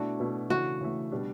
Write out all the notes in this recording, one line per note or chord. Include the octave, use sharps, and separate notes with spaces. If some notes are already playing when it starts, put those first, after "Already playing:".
Already playing: B2 A3 D4 E4 F#4
B2 A3 E4
C#3 E3 A3 F#4
C#3 E3 A3
B2 G3 D4